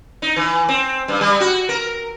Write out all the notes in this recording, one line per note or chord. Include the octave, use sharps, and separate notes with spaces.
D#4
E3
C4
G2
G3
F#4
A#4